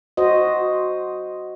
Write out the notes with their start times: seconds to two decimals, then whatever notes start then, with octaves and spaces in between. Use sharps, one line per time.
0.17 F#4 C5 D#5